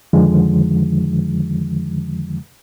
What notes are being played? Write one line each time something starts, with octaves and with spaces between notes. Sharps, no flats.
F2 D3 D#3 F3 G#3